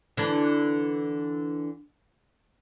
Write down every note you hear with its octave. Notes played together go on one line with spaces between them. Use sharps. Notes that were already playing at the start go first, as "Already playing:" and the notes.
D3 E3 D4